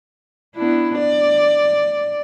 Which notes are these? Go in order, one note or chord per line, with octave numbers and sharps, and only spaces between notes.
B3 D4 E4
D5